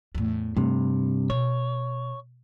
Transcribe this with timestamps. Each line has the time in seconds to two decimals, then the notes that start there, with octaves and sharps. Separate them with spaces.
0.15 E2 A2
0.57 G2 C3 A3
1.30 B2 C#5